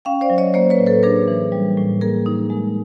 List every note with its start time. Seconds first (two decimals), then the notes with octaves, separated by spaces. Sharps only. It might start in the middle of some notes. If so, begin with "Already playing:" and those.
0.05 C#4 F5 G5
0.21 C5 D5
0.30 F#3
0.38 C#5 D#5
0.54 A#3 C5 D5
0.70 B4 C#5
0.78 A2
0.87 A4 B4
1.03 D4 G#4 A#4
1.28 E3
1.52 G3
1.77 A2
2.01 A#3 G#4 A#4
2.26 D#4
2.50 G#3